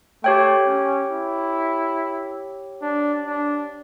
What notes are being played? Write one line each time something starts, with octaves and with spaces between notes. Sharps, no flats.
A3 G4 C#5 G5
C#4
E4
D4
D4